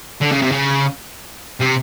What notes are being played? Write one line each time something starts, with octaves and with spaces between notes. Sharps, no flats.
D3
C#3
C3
C#3
C3